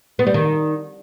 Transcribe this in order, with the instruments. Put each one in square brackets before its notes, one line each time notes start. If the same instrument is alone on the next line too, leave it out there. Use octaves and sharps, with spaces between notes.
[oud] B3
G3
D#3